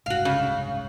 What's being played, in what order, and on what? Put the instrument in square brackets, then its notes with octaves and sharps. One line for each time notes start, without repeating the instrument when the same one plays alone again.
[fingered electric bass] F#1 C2 G#2 [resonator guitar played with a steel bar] F#4 F5
[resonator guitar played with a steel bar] C#3